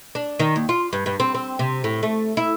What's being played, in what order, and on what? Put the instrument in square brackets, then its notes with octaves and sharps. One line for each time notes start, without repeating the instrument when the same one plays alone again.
[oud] D4
D#3
D#2
F4
G2
G2
C4
C4
C3
A2
A3
E4